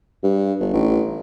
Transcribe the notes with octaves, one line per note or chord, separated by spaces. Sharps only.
G2
G1
A1